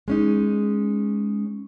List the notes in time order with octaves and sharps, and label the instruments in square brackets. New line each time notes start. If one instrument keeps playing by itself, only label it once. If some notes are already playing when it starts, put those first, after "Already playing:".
[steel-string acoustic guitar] G#3 C#4 D#4